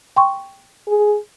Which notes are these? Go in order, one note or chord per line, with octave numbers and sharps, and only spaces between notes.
G5 C6 C#6
G#4